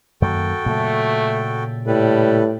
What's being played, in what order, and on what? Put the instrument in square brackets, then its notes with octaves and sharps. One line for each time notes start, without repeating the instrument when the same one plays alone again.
[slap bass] F#2 D#3 A#3 [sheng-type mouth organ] F#4 A4 G5
[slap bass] A#2 C#3 F#3 [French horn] A3
[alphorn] A2 [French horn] G3 [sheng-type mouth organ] A4 B4